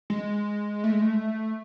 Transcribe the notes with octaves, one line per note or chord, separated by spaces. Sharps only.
G#3
A3
G#3
A3